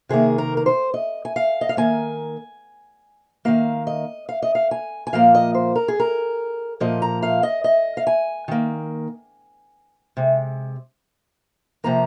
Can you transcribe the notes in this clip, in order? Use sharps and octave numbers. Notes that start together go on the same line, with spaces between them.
C3 D#3 A#3 G#4
A#4
A#4
C5
D#5
G#5
F5
D#5
F5
D#3 A#3 G#5
D#3 A#3 F5
D#5
F5
D#5
F5
G#5
G#5
A#2 F3 A#3 F5
D#5
C5
A#4
G#4
A#4
A#2 F3 A#3 D#5
A#5
F5
D#5
D#5
F5
G#5
D#3 A#3
C3 G#3
C3 F3 A#3 A#5